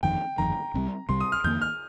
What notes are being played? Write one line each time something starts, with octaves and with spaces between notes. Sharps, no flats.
G1 F2 D#3 G5
G1 F2 D#3 A#5
C2 C3 G3
C2 C3 G3 C6
D#6
F6
F2 D#3 A#3 G6
F6